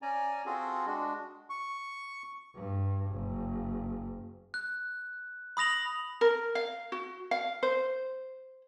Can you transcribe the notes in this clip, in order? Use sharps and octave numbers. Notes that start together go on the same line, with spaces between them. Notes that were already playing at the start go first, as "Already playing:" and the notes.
C#4 D5 G#5 A#5
C4 F4 F#4 G#4 A4
G#3 D4 F#4
C#6
G2
F#1
F#6
B5 D#6 A#6 F7 F#7
A#4
F5
F#4
F5
C5